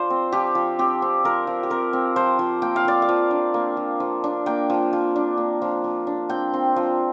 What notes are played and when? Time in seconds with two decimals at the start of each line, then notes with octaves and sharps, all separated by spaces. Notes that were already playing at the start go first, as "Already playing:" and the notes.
Already playing: F3 C5 D5 F5
0.10 C4
0.32 F3 G4
0.55 F3
0.79 C4 G4
1.02 C4
1.24 F3 A#4
1.47 F3
1.63 G4
1.70 C4 A#4
1.93 C4
2.16 F3 C5
2.39 F3
2.62 A#3 G5
2.76 F5
2.85 F3 D5
3.02 F5
3.09 F3
3.31 D4
3.54 A#3
3.77 F3
4.00 F3
4.24 D4
4.46 A#3 G5
4.70 F3
4.93 F3
5.16 D4
5.38 A#3
5.62 F3
5.84 F3
6.07 D4
6.29 C4 G5
6.54 C4
6.76 F3